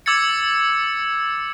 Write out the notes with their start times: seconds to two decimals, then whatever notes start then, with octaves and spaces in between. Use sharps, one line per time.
0.06 D6 E6 G#6 A6 C#7